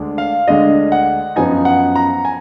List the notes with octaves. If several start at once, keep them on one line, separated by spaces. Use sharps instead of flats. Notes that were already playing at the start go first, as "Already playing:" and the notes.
Already playing: D2 D3 G#3 D4
F5
D2 D3 G#3 D4 D#5
F#5
F#2 F3 B3 D#4 G#5
F#5
A#5
G#5